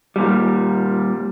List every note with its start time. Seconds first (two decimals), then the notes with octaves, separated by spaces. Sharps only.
0.16 A#2 G3